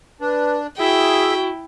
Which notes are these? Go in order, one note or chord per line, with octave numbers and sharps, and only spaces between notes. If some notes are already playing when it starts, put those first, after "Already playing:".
D4 B4
E4 F#4 G#4 E5 G5